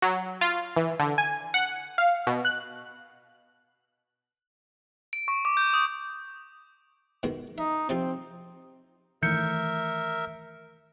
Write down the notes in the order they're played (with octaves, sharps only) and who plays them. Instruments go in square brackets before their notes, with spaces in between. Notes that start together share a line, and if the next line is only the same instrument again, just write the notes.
[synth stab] F#3
F4
E3
D3
G#5
F#5
F5
B2
F#6
[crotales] D7
C#6
D6
G6
D#6
[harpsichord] G#2 B2 D#3
[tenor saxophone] D#4 [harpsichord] E5
[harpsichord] C3 F3 F4 [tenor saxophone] C4
[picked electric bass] D#3 E3 A3 [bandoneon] A#4 E5 [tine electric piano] G6 C#7